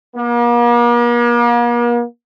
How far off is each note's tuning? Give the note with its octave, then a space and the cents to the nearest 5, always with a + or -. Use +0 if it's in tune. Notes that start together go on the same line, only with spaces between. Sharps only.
A#3 +40